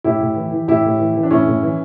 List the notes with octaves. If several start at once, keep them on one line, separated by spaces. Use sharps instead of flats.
A2 E4 G4
A2
E3
E3
A2 E4 G4
A2
E3
E3
D4
A2 C#4 E4
A2
E3